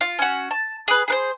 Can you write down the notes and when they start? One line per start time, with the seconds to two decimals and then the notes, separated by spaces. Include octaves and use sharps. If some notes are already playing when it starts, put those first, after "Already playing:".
0.01 F4
0.19 C#4 F#4
0.51 A5
0.88 G#4 B4
1.08 G#4 B4 C5